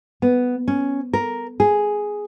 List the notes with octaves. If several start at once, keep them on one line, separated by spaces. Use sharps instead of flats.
B3
C#4
A#4
G#4